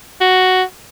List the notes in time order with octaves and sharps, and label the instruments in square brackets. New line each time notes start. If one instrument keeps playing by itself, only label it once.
[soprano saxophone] F#4